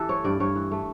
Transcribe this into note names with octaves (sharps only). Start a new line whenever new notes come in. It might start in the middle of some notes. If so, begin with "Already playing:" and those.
Already playing: E3 G4 A4
A3 C#5
G2 D5
G2 C#5
E3
A3